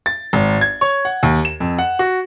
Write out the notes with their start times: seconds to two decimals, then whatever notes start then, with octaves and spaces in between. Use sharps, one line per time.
0.06 A6
0.33 G#1
0.61 G#6
0.81 C#5
1.05 F#5
1.23 D#2
1.45 E7
1.60 F2
1.79 F#5
1.99 F#4